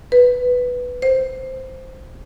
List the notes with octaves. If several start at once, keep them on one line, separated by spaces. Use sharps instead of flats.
B4
C5